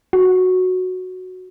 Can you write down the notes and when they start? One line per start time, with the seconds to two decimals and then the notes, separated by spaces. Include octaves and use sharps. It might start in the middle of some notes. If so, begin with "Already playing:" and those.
0.13 F#4